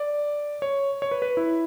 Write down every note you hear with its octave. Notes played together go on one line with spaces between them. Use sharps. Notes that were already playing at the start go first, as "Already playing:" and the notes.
Already playing: D5
C#5
C#5
B4
B4
E4